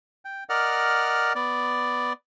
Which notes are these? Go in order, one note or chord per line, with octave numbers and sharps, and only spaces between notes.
G5
A#4 D5 D#5 F#5 F6
B3 D5